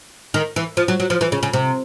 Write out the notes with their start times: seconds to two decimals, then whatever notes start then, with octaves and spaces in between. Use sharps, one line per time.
0.34 D#3
0.56 E3
0.77 F3
0.88 F#3
1.00 F#3
1.10 F3
1.21 E3
1.32 C#3
1.43 C#3
1.53 C3